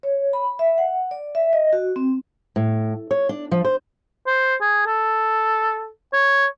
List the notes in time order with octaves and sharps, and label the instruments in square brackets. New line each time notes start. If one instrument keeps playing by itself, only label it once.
[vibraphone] C#5
B5
E5
F#5
D5
E5
D#5
F#4
C4
[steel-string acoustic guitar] A2
C#5
D4
F3
C5
[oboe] C5
G#4
A4
C#5